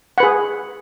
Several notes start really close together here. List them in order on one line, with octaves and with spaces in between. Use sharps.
F#5 B4 G#4